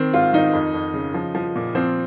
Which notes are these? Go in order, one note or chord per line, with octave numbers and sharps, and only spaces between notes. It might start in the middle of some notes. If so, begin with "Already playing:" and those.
Already playing: D#3 C4
G#2 F4
D#3 D#4
F2
F2
C#3
F3
F3
A#2
F3 C4